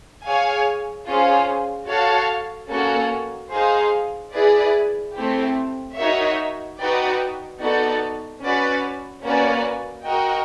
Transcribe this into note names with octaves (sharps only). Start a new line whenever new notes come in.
G#4 C#5 F5 G#5
C#4 F4 G#4 C5
F#4 A4 C#5 F5 A5
A#3 C#4 F#4 A4
D#4 G#4 C5 F5
E4 G#4 B4 D5
A3 C4 E4 G4
D#4 F#4 A#4 C#5 E5
D#4 F#4 B4 D5 G5
B3 D#4 F#4 A4 D5
C#4 F#4 B4 D5
A#3 C#4 F#4 B4 D5
F#4 A#4 D#5 G5